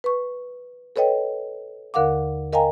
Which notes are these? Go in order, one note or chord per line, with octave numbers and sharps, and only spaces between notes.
B4 C#6
A4 B4 C#5 D#5 G5
D#2 D3 A#4 F5 F#5 D6
A#4 D#5 F5 G5 G#5 A#5